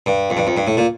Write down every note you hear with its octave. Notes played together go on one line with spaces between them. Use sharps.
G2
F2
G2
F2
G2
A2
A#2